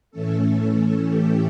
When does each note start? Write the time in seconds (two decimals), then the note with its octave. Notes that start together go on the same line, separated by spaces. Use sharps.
0.11 A2 E3 A3 C#4 A4
1.06 G4